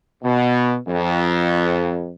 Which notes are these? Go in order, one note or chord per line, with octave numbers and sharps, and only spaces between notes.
B2
F2